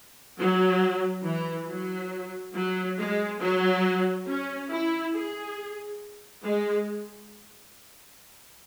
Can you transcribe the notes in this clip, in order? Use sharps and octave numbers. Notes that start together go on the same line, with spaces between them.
F#3
E3
F#3
F#3
G#3
F#3
C#4
E4
G#4
G#3